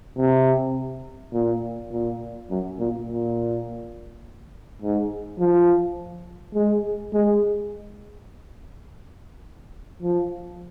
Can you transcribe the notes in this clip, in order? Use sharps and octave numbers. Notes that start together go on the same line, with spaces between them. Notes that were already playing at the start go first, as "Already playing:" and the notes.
C3
A#2
A#2
F#2
A#2
A#2
G#2
F3
G#3
G#3
F3